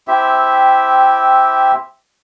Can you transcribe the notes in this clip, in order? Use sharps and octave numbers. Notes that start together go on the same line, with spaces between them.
C4 E4 G4 E5